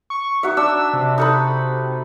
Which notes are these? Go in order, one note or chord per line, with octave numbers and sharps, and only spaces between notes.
C#6
D#4 F#4 E5
D4 E6
C3
D#4 A4 B5